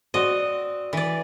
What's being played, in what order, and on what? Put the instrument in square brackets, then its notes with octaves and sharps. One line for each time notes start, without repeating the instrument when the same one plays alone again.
[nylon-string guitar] C4 F#4 D5 [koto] D#5
[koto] E3 D5